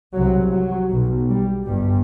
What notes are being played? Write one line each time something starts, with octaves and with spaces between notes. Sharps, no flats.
C2 C3 F#3
F#3
B1 B2
G3
G1 G2 G3